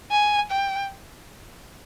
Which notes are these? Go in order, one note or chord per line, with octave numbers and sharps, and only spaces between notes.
G#5
G5